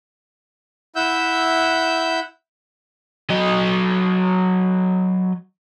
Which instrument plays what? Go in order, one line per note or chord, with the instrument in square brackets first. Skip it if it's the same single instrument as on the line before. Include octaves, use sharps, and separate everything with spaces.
[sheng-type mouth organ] E4 E5 F#5 E6 G6
[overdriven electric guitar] F#3 D#5